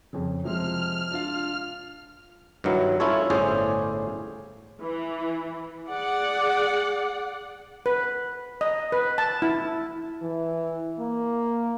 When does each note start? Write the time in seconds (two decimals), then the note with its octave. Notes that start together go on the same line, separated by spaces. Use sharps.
0.13 F2 C#3
0.44 C3 F3 G#3 F6
1.11 D4 F4 F5
2.64 G2 D#3 F#3 E4
3.00 C#4 E4 F4 A4 C#5
3.30 G1 A2 C#4 G#4 C5 D5
4.82 E3
5.89 G#4 D5 F#5
7.86 B4
8.61 D#5
8.92 B4
9.18 A5
9.42 E4
10.22 E3
10.99 A#3